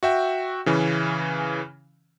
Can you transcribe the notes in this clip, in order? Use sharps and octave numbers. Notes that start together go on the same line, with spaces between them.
F#4 E5 G5
C#3 E3 C#4